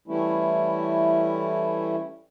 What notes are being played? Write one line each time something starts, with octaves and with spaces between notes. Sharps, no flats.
E3 G3 A3 C#4 E4